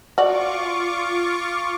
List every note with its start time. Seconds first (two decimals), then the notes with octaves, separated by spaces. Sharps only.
0.18 F4 F#4 D5 C#6 D6